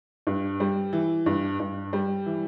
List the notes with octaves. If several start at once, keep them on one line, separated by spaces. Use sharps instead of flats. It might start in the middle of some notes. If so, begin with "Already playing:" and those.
G2
G3
E3
G2
G2
G3
E3